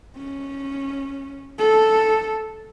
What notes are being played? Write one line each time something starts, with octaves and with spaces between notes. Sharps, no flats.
C#4
A4